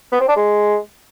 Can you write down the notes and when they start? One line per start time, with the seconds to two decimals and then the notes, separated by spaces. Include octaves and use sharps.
0.12 B3
0.20 C4
0.28 D4
0.36 G#3